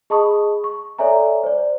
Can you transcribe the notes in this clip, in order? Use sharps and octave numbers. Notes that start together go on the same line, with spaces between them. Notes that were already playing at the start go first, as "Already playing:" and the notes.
G#4 D#5 A5 B5 C#6 D#6
C#6
A4 C#5 D5 E5 G#5 A#5
C5 D5